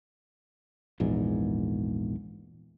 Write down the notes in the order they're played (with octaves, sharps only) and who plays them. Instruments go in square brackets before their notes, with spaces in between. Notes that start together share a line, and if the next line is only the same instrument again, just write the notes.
[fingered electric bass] A#1 E2 G#2